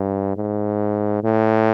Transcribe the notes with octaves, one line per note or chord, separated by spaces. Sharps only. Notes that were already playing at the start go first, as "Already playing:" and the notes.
Already playing: G2
G#2
A2